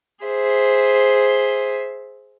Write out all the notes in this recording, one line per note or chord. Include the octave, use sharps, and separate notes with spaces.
G#4 C5 E5